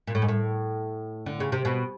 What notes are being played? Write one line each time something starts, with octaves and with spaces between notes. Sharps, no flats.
A#2
A2
G#2
A2
D3
C#3
C3
B2